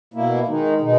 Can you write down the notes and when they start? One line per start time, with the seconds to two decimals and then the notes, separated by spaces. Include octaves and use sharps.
0.14 B2 A#3 E4
0.48 D#3 G#3 D#4
0.81 B2 G#3 D#4